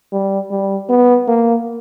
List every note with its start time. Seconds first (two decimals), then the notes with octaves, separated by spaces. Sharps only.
0.13 G3
0.51 G3
0.89 B3
1.28 A#3